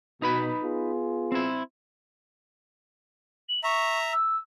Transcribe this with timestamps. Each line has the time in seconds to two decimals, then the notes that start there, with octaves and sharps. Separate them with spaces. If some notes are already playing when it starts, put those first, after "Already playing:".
0.22 B2 D#4 B4 B5
0.63 B3 F4 G#4
1.32 C4 E4
3.48 F#7
3.64 E5 A#5 C#6
4.12 E6